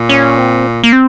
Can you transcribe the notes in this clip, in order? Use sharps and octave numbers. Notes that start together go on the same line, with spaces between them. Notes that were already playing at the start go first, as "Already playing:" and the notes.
Already playing: A#2
C#4
C4
A#3
C4